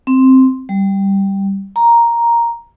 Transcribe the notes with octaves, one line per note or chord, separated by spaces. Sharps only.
C4
G3
A#5